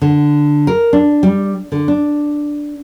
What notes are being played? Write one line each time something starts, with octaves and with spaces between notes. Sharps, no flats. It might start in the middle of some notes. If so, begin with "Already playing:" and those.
D3
A#4
D4
G3
D3
D4